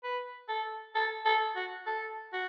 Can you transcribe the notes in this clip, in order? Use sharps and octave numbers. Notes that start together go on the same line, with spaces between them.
B4
A4
A4
A4
F#4
A4
F#4